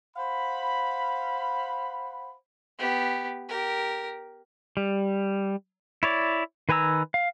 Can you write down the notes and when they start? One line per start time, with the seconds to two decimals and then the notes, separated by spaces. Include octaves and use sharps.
0.16 C5 F5 F#5 B5
2.79 B3 G4
3.49 G4 A#4
4.77 G3
6.03 E4 C#5 D5
6.69 D#3 B4 G#5 A#5 E6
7.14 F5